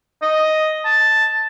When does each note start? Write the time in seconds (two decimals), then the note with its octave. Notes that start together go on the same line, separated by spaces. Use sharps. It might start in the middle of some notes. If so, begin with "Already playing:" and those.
0.22 D#5
0.85 A5